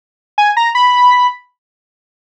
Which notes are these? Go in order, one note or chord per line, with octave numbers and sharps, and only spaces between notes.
G#5
A#5
B5